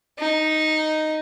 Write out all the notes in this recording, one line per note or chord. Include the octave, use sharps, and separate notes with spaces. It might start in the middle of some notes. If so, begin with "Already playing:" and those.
D#4